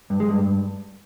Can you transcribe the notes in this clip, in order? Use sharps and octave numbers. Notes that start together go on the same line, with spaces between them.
G2
G#3
G2